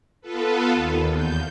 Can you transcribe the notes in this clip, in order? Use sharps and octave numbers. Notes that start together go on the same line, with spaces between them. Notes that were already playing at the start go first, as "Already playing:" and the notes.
B3 F4 A4 B4
D#2
E2 G6